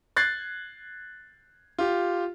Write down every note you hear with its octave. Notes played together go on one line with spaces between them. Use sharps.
F#6 G#6 A6 C7
F4 G4